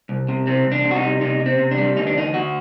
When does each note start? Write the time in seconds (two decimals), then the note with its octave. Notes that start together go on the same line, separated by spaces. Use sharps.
0.09 C2
0.28 C3
0.47 C2 C4
0.66 C2
0.72 D4
0.84 C3
0.91 F#4
0.96 D#4
1.03 G3
1.21 C3 D#4
1.40 C3
1.46 C4
1.59 C3
1.71 D4
1.77 G3
1.96 D2 D#4
2.07 D4
2.15 D2 D#4
2.33 D2 F#4